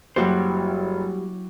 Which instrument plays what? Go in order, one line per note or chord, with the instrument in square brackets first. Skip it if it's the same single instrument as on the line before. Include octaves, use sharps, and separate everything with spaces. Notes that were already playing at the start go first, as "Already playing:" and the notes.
[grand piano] F#1 [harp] F#3 E4 G4 [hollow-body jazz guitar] G3 F#4 C5